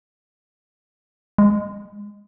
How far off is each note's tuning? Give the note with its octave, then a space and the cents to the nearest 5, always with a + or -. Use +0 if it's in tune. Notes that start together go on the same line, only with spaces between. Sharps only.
G#3 -20